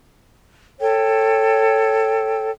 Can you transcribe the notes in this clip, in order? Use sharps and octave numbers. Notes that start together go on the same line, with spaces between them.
A4 C#5 G5